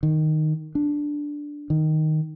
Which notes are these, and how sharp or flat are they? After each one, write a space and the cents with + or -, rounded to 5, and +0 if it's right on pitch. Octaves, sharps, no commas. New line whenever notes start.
D#3 -5
D4 +0
D#3 -5